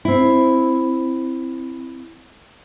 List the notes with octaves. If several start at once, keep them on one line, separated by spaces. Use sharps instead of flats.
C4 E4